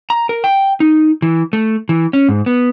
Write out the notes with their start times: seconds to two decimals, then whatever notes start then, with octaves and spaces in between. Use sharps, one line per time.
0.10 A#5
0.29 A#4
0.44 G5
0.80 D#4
1.22 E3
1.53 A3
1.89 E3
2.13 C#4
2.29 G#2
2.46 B3